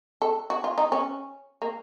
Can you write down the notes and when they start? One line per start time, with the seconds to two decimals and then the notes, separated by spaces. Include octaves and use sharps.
0.22 A4
0.50 F#4
0.64 F4
0.78 D#4
0.92 C#4
1.62 A#3